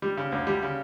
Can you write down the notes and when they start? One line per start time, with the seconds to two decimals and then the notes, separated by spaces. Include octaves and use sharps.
0.02 G3
0.17 C#3
0.32 D2
0.47 G3
0.62 C#3